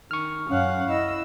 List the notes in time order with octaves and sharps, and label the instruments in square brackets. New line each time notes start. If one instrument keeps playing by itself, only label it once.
[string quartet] D#3 [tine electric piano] C#6 F6
[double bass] F#2 [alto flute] C#4 [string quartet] F5 F#5 F#6
[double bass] E4 [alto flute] D#5 [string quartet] E6